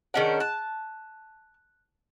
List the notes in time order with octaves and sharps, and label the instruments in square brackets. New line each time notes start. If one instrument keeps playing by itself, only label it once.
[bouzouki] D#3 C#4 D4 [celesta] G#4 D#5 F#5
[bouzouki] A5 [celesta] F#6